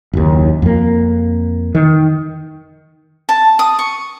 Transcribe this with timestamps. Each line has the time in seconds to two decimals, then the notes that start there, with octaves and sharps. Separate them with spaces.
0.13 F#1 D#2
0.62 F2 A#3
1.75 D#3
3.29 A5
3.59 D#6
3.79 C#6